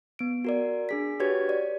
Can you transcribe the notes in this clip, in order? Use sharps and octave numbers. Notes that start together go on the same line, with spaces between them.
B3 D7
F#4 A#4 D5
D4 G#4 B6
F#4 G4 B4 C#5 G#6
D5